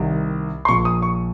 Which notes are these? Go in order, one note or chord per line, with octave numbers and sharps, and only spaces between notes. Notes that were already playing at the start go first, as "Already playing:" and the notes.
Already playing: C2 C3 D#3
C6
A#1 A#2 C#6
D#6
C#6